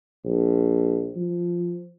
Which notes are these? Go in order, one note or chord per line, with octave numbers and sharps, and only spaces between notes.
A#1
F3